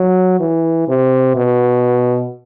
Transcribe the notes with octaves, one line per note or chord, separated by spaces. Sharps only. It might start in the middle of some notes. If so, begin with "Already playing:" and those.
Already playing: F#3
E3
C3
B2